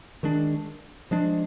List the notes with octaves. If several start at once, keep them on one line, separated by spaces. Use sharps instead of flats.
D#3 G#3 D4
F3 G#3 D4